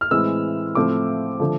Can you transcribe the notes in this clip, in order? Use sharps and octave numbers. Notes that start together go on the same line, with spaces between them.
F6
A2 E3 G#3 C4 E6
A2 F3 A3 C4 D6
D3 F3 A3